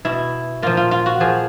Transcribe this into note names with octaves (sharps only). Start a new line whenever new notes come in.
B2 E4
A#2 F3 F4
F4
F4
F#4
A#2 F3 G#4